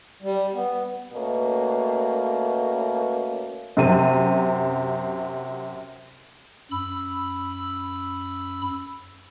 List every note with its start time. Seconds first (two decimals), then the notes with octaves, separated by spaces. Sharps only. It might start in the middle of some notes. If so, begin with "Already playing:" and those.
0.23 G3
0.55 B3
1.13 B2 A3 A#3 C#4
3.77 F#2 C3 D#7
6.71 F#2 B5 E6